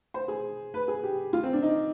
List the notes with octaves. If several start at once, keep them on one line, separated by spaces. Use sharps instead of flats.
C5
G#4
B4
G#4
G4
F4
C4
D4
D#4